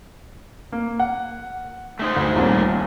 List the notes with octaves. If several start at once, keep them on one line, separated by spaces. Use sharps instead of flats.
A#3
F#5
A3 D#4 C5
D2
D#1 C2 A#2